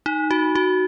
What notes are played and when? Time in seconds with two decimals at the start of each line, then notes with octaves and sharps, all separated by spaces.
0.06 D#4
0.31 F#4
0.55 F#4